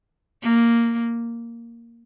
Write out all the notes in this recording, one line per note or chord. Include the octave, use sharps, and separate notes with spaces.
A#3